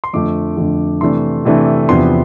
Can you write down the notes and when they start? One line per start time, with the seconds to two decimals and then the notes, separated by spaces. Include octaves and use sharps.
0.04 C6
0.13 F2 D3 F3 A3 D6
0.57 F2 D3 F3 A3
1.01 C3 E3 A3 D4 C6
1.45 C3 E3 A3 D4
1.89 E2 C3 F3 B3 D4 C6